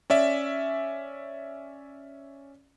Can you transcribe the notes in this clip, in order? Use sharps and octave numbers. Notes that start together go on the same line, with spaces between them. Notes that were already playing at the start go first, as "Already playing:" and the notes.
C#4 D5 E5